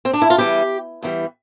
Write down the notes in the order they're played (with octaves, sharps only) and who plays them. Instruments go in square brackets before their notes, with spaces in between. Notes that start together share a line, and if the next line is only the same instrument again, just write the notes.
[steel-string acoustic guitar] C4
D4
E4
F4
E2 E3 G3 G4
E2 E3 G3